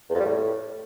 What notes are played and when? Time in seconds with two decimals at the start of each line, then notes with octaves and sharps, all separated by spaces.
0.10 E2
0.15 F2
0.20 G3
0.25 A2